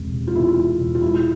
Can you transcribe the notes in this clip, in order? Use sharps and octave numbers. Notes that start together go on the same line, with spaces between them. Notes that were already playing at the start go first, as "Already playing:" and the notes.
Already playing: E1 C3
C3
F4
E2 E4
E2
E1
F4
G#3 E4